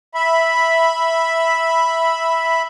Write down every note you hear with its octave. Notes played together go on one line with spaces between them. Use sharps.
E5 B5